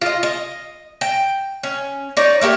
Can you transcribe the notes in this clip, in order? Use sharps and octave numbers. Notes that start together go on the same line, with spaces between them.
F4 D#5
D#5
G5
C#4
D#4 C#5 D5
A3 A#3 E4 G4